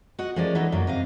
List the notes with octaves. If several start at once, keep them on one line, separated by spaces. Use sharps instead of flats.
F#4 D#5 F#5
F3 G#3 A3 C#4 A#4 D5
E3 B3 D#4 A4 C#5 D#5
F#2 F#3 A#3
C3 D#5 F5